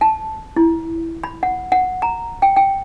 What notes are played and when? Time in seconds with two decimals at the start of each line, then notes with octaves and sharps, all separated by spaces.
0.01 A5
0.56 E4
1.24 B5
1.43 F#5
1.72 F#5
2.02 A#5
2.42 G5
2.56 G5